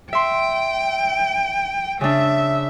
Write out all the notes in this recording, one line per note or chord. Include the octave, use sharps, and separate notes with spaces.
E5 G5 C6
C#3 D4 E5